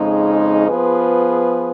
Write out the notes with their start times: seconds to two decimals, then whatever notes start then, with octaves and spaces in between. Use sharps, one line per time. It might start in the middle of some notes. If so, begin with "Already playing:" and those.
Already playing: F2 C#3 G#3 D#4
0.69 F3 B3 F4 G#4 B4